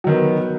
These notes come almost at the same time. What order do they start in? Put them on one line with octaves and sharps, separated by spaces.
F#3 D#3 B3